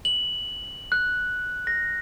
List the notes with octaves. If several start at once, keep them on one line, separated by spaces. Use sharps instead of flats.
F#7
F#6
A#6